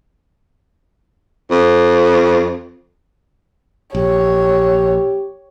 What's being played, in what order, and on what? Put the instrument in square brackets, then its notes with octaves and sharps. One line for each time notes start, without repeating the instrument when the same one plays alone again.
[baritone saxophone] F2
[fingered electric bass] A#1 [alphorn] G4 [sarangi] C#5